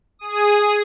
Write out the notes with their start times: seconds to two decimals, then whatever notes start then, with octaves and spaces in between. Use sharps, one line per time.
0.19 G#4 D#6